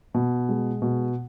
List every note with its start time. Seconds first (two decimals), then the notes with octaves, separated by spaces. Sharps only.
0.14 B2
0.49 G#3
0.82 B2